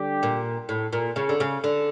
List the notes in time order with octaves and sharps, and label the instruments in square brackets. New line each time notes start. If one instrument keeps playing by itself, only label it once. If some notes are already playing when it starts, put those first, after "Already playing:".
Already playing: [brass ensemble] D3 G3 D4 G4
[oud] A#2
A2
A#2
C#3
D3
C#3
D3